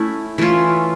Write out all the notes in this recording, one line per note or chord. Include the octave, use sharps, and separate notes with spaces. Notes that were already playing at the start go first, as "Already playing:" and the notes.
Already playing: A3 C#4 E4
E3 A3 C#4 F4